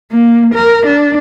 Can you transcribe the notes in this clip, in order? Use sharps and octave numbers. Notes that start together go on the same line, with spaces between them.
A#3
A#4
D4